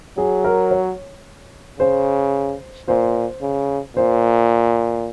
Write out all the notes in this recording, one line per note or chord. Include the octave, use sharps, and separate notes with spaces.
F#3 G#4
A#4
C#5
C#3 C5
A#2 C5
C#3
A#2 C5